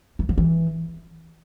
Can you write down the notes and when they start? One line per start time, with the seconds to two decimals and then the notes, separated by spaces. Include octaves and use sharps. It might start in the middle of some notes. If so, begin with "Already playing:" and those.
0.19 E3
0.29 F3
0.38 E3